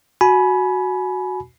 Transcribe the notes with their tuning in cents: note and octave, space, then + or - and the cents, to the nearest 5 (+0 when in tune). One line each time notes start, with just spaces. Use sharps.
F#4 +0 G#5 +30 B5 -10